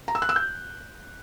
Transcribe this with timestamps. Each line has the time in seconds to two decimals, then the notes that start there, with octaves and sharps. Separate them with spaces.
0.08 A#5
0.15 E6
0.22 F#6
0.29 E6
0.36 G6